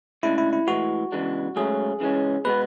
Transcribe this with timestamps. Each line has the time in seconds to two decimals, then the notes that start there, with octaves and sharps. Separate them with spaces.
0.23 D2 C#3 G#3 D4 E4
0.38 E4
0.53 E4
0.67 A2 E3 G#3 F#4
1.12 E2 C#3 E3 G#3 D4
1.56 G#2 F#3 A3 C#4 G#4
2.00 C#3 E3 G#3 C#4
2.45 B2 G#3 B3 B4